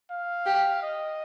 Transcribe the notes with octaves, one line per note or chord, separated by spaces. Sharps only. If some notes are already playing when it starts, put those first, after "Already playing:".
F5
G4
D#5